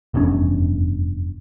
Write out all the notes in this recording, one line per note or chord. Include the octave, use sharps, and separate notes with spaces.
F1 E2 G2 C#4